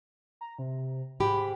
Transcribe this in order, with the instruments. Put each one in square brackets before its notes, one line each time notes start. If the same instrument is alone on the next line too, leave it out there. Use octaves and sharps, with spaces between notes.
[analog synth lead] A#5
C3
[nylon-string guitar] G#2 G4 [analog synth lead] B5